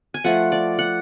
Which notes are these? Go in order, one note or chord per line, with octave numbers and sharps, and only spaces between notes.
G#5
F3 A3 F#5
D5
F#5